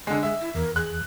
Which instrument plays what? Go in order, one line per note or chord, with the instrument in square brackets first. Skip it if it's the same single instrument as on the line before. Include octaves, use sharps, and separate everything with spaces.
[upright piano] D3 G#3 [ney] D4
[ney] G#3 [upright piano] E5
[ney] E4
[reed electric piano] E2 [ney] A#4
[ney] G#4 [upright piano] F#6